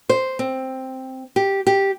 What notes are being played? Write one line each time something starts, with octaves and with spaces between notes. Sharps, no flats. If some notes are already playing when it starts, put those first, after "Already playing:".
C5
C4
G4
G4